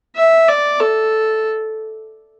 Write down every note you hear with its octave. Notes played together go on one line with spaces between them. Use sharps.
E5
D5
A4